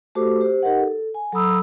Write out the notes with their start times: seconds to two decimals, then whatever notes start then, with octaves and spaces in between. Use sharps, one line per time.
0.15 A3 F#4 G4 A4 C5 D6
0.41 G4 C5
0.63 D#4 G4 A#4 D#5 F#5
0.79 A4
1.14 G#5
1.32 F#3 A4 A#5 B5 D#6 E6